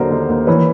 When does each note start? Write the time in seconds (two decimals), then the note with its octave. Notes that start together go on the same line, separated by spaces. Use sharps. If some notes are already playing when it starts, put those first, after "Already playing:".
Already playing: D#2 D3 F#3 A#4 C5
0.11 D#2
0.29 D#2
0.47 E3 B4 C#5